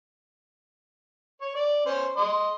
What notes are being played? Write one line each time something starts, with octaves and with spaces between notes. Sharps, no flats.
C#5
D5
C#4 C5
D#5 C6